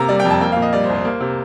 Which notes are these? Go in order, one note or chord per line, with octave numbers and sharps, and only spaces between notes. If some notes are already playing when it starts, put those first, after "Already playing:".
Already playing: C3 A#3 A#5
G3 D5
G5
F2
A5
A#3 G5
F5
A#2
D#5
G3 D5
C5
C2
C5
A#3
C3